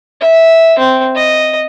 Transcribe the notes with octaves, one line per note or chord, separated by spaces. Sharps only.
E5
C4
D#5